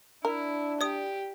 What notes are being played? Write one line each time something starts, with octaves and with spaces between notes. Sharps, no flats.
D4 E4 A#4
G4 D5 D#6